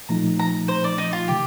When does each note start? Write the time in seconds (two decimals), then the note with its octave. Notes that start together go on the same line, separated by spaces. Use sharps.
0.09 A#2 F3 A3 D#4 A#5
0.39 A#5
0.68 C5
0.84 D5
0.98 D#4
1.13 F4
1.28 C3 D#3 G4